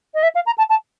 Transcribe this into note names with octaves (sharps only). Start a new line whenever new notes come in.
D#5
E5
F5
A#5
A5
A5